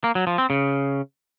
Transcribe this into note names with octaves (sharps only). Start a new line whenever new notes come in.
A#3
F#3
F3
C4
C#3